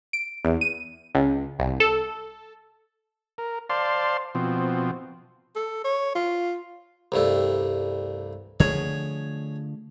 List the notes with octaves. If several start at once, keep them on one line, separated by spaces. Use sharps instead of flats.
D7
E2
D#7
C#2
C2
A4
A#4
C5 D5 F5 A5 C6
B2 F3 C4
A4
C#5
F4
C2 G2 A3
D3 F3 A3 G#4 C#5